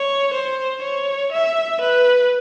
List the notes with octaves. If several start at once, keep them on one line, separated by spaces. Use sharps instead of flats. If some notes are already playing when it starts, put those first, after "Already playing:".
Already playing: C#5
C5
C#5
E5
B4